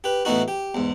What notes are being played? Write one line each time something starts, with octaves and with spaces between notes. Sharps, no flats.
G4 B4
A2 E3 B3 D#4 F#4
G4
E2 G#2